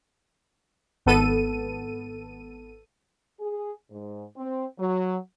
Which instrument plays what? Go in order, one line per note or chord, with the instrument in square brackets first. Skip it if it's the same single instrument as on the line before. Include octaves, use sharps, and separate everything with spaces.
[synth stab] G#1 B3 A4 D#7
[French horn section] G#4
G#2
C4
F#3